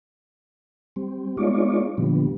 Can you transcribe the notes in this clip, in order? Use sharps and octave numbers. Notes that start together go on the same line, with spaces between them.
G3 C4
G#3 B3 D#4 F4 C#5 D5
A#2 D3 F3 G3 B3